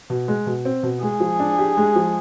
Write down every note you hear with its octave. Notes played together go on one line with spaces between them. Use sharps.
B2
G#3
B2
C4
B2
G#3 G#4
F3
D4
G4
G#3
F3